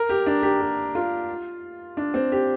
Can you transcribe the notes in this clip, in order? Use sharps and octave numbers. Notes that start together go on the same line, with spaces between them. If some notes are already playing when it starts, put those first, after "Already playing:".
Already playing: A#4
G4
D4
G4
G4
F4
D4
C4
G4